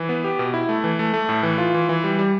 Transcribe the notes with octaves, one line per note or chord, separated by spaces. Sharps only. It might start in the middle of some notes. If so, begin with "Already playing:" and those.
Already playing: E3
B3
G4
B2
E4
A3
E3
A3
A3
A2
E3
F4
E3
E3
G3
G3